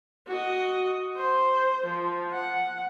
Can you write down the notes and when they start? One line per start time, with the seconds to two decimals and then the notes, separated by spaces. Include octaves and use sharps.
0.27 F#4 D#5
1.17 C5
1.86 F3
2.33 F#5